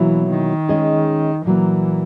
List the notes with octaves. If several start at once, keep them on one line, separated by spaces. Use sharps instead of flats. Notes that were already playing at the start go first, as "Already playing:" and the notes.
Already playing: B2 E3 F#3 A#3 E4
D#3
G#3 C#4 G#4 D#5
A#2 E3 F#3 A#3